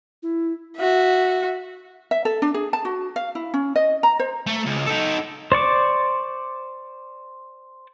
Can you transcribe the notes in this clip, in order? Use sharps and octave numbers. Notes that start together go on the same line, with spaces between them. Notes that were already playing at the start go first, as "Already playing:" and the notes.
E4
F#4 E5
E5
A4
D4
G#4
A5
F#4
F5
E4
C#4
D#5
A#5
C5
A3
C#2
D#4 A4
C5 D5 C#6 D6